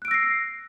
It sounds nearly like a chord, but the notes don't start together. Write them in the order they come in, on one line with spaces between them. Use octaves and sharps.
F#6 D7 E6 A#6 C7